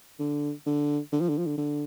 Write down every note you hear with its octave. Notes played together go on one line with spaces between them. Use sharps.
D3
D3
D3
F3
D3
F3
D3
D3